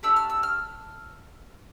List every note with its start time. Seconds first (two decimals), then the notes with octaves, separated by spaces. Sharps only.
0.03 A3 D4 G4 E6
0.16 F6
0.30 E6
0.43 F6